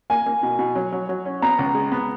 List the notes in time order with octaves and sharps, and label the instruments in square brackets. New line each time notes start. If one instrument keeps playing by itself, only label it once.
[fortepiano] A#3 [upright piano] G#5
[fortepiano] A#3
B2
B2
F#3
F#3
F#3
C#4
[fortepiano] B3 [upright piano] A#5
[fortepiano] C#2
G#3
B3